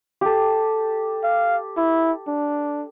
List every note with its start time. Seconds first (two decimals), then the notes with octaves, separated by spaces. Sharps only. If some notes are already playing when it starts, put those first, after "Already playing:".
0.21 G4 A4
1.24 F5
1.77 E4
2.28 D4